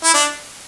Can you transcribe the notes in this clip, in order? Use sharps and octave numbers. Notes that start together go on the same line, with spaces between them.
E4
D4